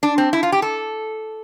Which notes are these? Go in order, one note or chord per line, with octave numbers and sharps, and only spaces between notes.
D4
C4
E4
F4
G4
A4